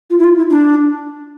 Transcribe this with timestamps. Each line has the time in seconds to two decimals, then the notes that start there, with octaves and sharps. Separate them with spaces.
0.10 F4
0.19 E4
0.24 F4
0.37 E4
0.50 D4